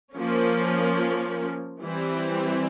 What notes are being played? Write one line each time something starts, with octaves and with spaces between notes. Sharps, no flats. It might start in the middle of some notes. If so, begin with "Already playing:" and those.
F3 A#3 C#4
E3 G3 C4